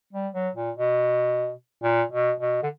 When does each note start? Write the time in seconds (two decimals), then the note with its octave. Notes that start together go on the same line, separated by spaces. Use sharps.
0.13 G3
0.34 F#3
0.56 A#2
0.77 B2
1.83 A#2
2.12 B2
2.40 B2
2.63 D3